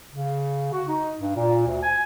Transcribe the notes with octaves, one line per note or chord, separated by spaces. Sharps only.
C#3
F#4
D#4
G2
A#2
D2
G#5